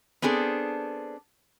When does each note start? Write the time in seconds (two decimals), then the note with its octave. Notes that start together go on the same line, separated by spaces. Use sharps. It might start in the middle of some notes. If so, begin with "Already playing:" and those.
0.22 B3 C4 D4 G#4 A4